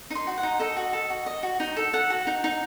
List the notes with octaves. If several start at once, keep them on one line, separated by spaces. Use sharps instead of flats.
D#4 C6
F#4
F#5
D#4
A4 D#5
F#4
A4
F#4
D#5
F#4
D#4
A4
A4 F#5
F#4
D#4
D#4